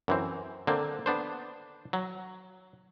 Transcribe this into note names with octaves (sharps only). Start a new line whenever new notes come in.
F#2 E3 C4
D3 A#3 C4
B3 D4 C5
F#3